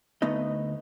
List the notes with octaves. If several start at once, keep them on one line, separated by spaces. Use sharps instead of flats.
D2 A3 B3 D#4 D#5